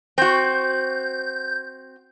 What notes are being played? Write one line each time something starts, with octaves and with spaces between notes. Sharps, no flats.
C4 F#4 G6